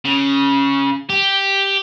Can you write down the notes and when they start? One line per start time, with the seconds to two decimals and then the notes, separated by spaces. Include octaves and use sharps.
0.05 C#3
1.10 G4